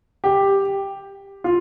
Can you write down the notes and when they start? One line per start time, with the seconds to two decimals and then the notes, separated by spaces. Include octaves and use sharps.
0.24 G4
1.44 F4